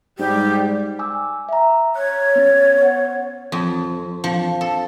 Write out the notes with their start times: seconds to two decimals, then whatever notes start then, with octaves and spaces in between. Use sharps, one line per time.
0.19 G#2 G3 G4
0.99 G#5 D6 E6
1.49 E5 A#5
1.96 C#5 F#6
2.36 B3 C#4 A6
2.83 C5 F#5
3.52 F2
4.24 F3
4.61 A4